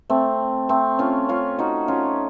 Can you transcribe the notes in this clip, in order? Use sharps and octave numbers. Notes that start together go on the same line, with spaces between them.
A3 C4
A3 C4
C#4 F4
C#4 F4
D#4 F#4
C#4 F4